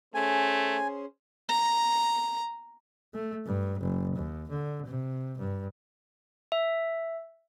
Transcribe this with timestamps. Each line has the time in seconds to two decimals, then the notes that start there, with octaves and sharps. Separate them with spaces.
0.14 A3 C#4 G#4 C5 G#5
1.49 A#5
3.14 A3
3.45 G2
3.80 F#1
4.16 D#2
4.50 D3
4.86 C3
5.38 G2
6.52 E5